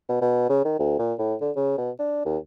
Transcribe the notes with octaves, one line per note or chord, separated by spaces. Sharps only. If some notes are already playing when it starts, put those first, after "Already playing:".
B2
B2
C#3
D#3
D2
A#2
A2
D3
C#3
B2
D4
D#2